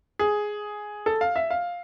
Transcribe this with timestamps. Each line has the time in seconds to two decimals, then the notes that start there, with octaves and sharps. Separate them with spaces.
0.19 G#4
1.06 A4
1.21 F5
1.36 E5
1.51 F5